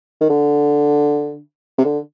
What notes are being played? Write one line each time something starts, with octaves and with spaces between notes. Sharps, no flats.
D#3
D3
C3
D3